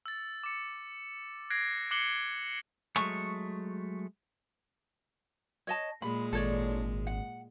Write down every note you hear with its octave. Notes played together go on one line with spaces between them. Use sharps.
E6 A6
D6 C#7
F#6 G#6 A#6 C7 D7
D6 F#6 C7 C#7 F#7 G7
F#3 G#3 A3 C#6
C#5 D#5 A5
A#2 G#3 B5
G#1 A4 C#5 D5
F#5